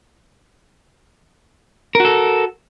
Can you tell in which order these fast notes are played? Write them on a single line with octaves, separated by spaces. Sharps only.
A#4 F#4 A4